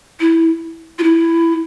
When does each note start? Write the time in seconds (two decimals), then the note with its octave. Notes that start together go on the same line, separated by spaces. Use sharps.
0.20 E4
0.99 F4
1.03 E4